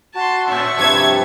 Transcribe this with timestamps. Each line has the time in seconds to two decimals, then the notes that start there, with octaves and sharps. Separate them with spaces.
0.15 F#4 A5 C6
0.48 A2 C#4 E5 A5 C#6
0.78 G2 C3 F3 G4 B4 G#6